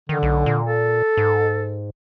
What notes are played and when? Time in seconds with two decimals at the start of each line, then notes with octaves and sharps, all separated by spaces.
0.09 D3 D#3
0.23 B1
0.46 A#2
0.66 A4
1.17 G#2